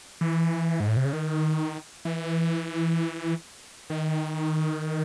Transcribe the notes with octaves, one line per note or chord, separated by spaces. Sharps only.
E3
G#2
A2
C3
C#3
D#3
E3
D#3